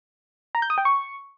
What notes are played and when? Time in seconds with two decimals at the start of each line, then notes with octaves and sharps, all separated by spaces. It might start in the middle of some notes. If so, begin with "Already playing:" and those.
0.55 A#5
0.62 G6
0.70 D#6
0.78 G5
0.85 C#6